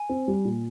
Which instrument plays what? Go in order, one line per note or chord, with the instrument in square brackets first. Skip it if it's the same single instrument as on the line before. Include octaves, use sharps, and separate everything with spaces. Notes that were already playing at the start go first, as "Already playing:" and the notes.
Already playing: [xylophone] G#5
[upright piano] C4
G3
A#2